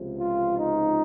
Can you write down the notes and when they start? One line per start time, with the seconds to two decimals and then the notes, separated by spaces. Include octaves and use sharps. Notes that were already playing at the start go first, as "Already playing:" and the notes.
Already playing: C#2 C3 F3
0.19 F4
0.57 D#4